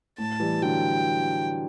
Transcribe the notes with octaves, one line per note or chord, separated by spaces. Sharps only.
A2 A5
E3 G3
D3 F#3 G5